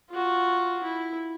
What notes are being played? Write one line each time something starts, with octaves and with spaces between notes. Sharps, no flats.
F4 F#4
E4